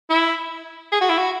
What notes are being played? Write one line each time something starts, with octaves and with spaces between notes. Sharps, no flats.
E4
G#4
F#4
E4
F#4